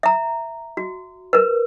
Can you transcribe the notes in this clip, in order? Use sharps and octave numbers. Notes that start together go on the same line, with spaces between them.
E5 A#5
F#4
A#4 B4